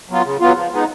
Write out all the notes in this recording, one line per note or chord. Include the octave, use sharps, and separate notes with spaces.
F#3 B3 F4
C#3
F#3 B3 F4
F3
G#3 B3 D#4